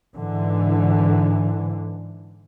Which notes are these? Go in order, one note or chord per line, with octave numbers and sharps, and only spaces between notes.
G#2 D3 E3